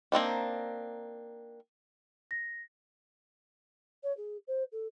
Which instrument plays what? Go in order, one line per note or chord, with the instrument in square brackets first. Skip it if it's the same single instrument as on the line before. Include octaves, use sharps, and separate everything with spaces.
[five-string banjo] A#3 C4 D4 D#4
[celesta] A#6
[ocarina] C#5
G#4
C5
A4